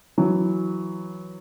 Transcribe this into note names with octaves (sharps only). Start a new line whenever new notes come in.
E3 F#3